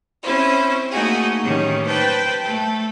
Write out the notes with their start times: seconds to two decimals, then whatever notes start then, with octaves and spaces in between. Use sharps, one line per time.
0.23 C4 C#4 E4 C5
0.91 A3 A#3 D#4 F#4 G#4
1.42 A2 D#3 G3 C#4
1.85 B4 C5 G5 A5 B5
2.44 A3 A4